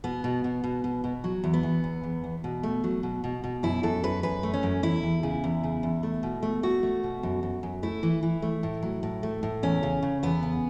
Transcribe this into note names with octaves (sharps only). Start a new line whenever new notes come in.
B2 B3
B2
B2
B2
B2
B2
F#3
E2
B3
E2
E2
E2
E2
B2
A3
F#3
B2
B2
B2
F#2 E4
F#2 A4
F#2 B4
F#2 B4
A3
C#4
F#2
E2 E4
E2
C#3
E2
C#3
E2
A3
B2
A3
A3 F#4
A3
B2
F#2
F#2
F#2
A3 E4
E3
E3
A3
A2
F#3
A2
A3
A2
E2 C#4
C#3
C#3
E2 B3
C#3